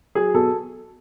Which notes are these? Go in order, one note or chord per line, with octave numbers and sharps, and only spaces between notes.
F#3 G#4
B2 A4